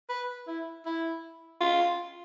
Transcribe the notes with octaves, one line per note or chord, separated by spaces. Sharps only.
B4
E4
E4
F4